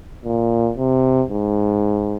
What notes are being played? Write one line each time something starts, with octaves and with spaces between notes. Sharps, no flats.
A#2
C3
G#2